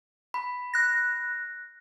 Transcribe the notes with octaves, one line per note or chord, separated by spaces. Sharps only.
B5
F#6 A#6